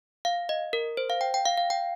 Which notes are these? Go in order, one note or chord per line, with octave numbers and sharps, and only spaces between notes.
F5
D#5
A#4
C5
F5
G5
G5
F5
F5
G5